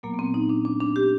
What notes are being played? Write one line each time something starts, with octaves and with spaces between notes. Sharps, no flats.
A#2 F#3 A#3 B3
B3
C4
D#4
D4
D4
D4
G4